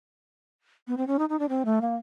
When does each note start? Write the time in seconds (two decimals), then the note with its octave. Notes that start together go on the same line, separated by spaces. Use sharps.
0.88 B3
0.97 C4
1.07 C#4
1.19 D#4
1.29 D#4
1.39 D4
1.49 C4
1.65 A3
1.81 A#3